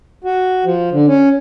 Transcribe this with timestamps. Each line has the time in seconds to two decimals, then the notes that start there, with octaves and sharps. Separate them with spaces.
0.24 F#4
0.65 F3
0.92 D3
1.07 C#4